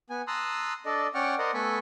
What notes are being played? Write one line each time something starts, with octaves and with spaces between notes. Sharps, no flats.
B3 G#5
A5 A#5 C6 D#6 E6 F#6
D4 A4 D5 D#5
C#4 D5 F#5 G5 C#6 F6
A#4 C5 D5 D#5 F#5
A3 B3 A4 G#5 B5 C#6